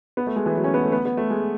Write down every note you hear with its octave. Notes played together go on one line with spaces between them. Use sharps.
B3
A3
G#3
E3
F#3
C#4
B3
A3
B3
B3
A3
G#3